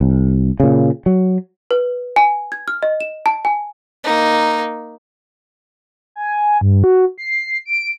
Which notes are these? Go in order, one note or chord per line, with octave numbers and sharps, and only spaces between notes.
C2
A#2 C#3
F#3
B4
G#5
G#6
F6
D#5
E7
A5
G#5
A#3 D#4
G#5
G2
F#4
C7
D7